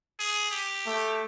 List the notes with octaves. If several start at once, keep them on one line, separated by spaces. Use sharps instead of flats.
G#4
G4
A3